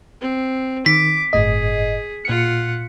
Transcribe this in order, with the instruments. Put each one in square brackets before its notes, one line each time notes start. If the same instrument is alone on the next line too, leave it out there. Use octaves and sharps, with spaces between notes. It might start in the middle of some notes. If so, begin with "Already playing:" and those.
[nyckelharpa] C4
[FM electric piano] D#3 [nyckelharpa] D6 [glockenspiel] B6
[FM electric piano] G1 A2 D#5 [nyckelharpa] G#4
[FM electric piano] A#2 C#7 [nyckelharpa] F4 F#5